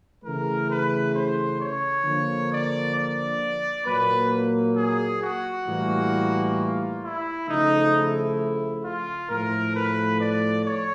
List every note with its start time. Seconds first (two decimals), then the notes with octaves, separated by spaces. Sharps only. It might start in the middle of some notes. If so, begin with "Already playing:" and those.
0.23 C#3 E3 A3 A#4
0.68 B4
1.14 C5
1.59 C#5
2.04 D3 F3 A#3
2.50 D5
2.95 D5
3.85 A#2 F#3 A#3 B4
4.76 G#4
5.21 F#4
5.66 A2 E3 G3 A#3
6.57 F4
7.02 E4
7.47 C#3 F3 A3 D#4
7.93 E4
8.83 F4
9.28 A2 F3 A3 A#4
9.74 B4
10.19 D5
10.64 C#5